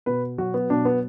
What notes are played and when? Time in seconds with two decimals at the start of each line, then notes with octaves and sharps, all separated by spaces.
0.06 B2 B4
0.38 F#3 F#4
0.54 B3
0.70 B2 D4
0.85 B3